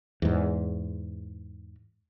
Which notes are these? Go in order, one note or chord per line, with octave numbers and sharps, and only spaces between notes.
E2 G#2